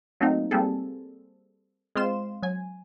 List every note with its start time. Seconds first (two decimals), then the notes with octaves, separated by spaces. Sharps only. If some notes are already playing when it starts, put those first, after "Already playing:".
0.20 F#3 A3 A#3 C4 D#4
0.51 G3 A#3 C4 G#4 A4
1.95 G#3 C4 F4 C6 E7
2.43 F#3 G#5